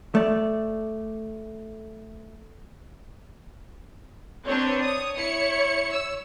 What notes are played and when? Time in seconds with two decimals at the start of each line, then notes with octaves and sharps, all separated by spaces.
0.15 A3 D5
4.46 C4 D4 B4 C#5
4.83 C#5 D#6
5.15 E4 C#7
5.92 E6